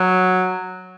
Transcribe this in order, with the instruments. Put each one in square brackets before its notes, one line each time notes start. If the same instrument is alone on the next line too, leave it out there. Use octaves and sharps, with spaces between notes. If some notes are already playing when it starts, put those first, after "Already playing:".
Already playing: [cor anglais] F#3